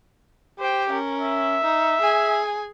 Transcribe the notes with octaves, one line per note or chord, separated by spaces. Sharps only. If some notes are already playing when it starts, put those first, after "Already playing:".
G4 C5 G5
C#4 A#4
E5
D#4
G#4 G#5